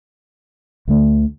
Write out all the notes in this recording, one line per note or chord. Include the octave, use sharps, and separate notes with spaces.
D2 D3 A3